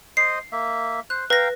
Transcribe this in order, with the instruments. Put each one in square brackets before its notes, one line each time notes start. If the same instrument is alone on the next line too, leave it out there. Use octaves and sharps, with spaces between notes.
[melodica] C5 D#5 [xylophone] C7
[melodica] A#3 E5
[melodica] C5 [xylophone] F#6
[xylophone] B4 A#6 [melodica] F5 G5 A#5